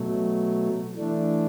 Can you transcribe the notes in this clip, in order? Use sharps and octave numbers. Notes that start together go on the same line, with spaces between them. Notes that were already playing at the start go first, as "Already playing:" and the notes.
Already playing: B2 F#3 A3
E3 A3 D4